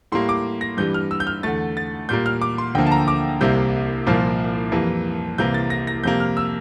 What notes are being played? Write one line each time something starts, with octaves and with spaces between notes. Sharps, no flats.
A2 G3 A#3 C6
D6
A#6
G2 E3 G3 G6
F6
E6
G6
F6
E2 D3 A3 A6
A6
A#2 G3 A#3 G6
F6
D6
C6
D2 D3 F3 A#3 G5
A5
A#5
D6
C2 C3 G3 A#3 G6
C2 A#2 F3 A#3
F2 E3 G3 A#3
C2 C3 E3 A#3 G6
A6
A#6
A#6
F2 C3 G3 A#3 G6
F6
E6